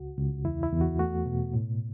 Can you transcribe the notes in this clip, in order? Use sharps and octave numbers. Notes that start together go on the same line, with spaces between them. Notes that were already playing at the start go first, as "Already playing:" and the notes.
Already playing: C#2 F#4
C#2
E2 E4
E4
E2
F#4
A3 F#4
B2
A2